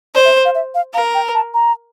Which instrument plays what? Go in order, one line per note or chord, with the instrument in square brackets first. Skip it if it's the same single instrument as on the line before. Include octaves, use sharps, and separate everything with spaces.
[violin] C5 [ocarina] D5
[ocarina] E5
F5
E5
F5
[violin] A#4 [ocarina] F5
[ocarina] G5
A5
A#5